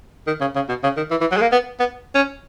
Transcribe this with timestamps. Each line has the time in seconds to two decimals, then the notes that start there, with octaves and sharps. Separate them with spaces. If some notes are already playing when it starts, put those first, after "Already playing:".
0.27 D#3
0.41 C#3
0.55 C#3
0.69 B2
0.83 C#3
0.97 D#3
1.11 E3
1.21 E3
1.31 F#3
1.37 G#3
1.41 A#3
1.52 B3
1.80 B3
2.15 C#4